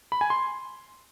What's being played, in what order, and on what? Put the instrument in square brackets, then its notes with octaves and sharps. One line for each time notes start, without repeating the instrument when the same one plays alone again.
[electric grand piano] B5
G#5
C6